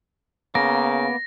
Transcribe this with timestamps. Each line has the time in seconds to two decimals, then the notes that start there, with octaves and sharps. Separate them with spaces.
0.55 C#3 A#3 B3 A#4 A#6